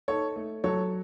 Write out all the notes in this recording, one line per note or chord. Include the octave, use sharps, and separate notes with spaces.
D#4 A4 C#5
A3
F#3 A4 C#5